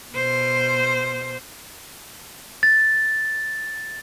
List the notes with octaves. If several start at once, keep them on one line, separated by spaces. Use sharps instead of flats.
B2 C5
A6